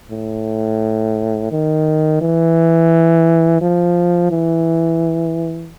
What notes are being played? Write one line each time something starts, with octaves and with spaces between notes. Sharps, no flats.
A2
D#3
E3
F3
E3